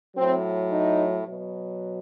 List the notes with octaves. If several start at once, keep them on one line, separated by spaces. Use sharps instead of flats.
A2 F#3 C4
D#4
B2 F#3